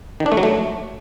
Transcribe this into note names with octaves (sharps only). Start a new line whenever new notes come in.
D#3
D4
A3
F#3
A3